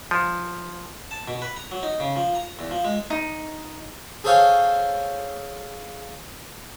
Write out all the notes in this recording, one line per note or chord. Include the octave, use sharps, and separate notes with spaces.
F3
A5
B2
B4
A#5
F#3
D#4
C#3
F3
A#5
E2
F3
G#3
D#4
G#4 A4 C5 C#5 F5 G#5